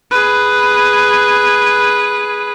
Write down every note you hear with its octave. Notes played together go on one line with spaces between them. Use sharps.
G#4 B4